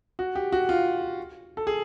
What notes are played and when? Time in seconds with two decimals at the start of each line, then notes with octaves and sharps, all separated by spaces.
0.19 F#4
0.35 G4
0.52 F#4
0.69 F4
1.57 A4
1.67 G#4